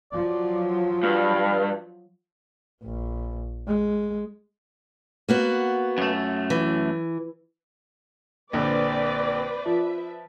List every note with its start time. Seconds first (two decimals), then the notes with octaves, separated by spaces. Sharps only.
0.12 F3 F#3 D5
1.03 G2 F5
2.82 A#1
3.68 G#3
5.28 A#3 B3 F#4
5.98 F#2 A3
6.50 E3
8.53 A#1 D3 C4 B4 C5 D5
9.66 F3 B4 E5